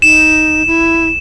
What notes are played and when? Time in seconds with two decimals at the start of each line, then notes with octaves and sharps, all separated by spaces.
0.02 D#4 E7
0.67 E4